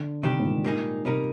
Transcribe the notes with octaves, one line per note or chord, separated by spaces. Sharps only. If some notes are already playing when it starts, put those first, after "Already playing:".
Already playing: D3
C3 D#3 G3 D4 G4
G#2
A#2
G#2 G3 A#3 D#4 G#4
C3 G3 A#3 D#4 A#4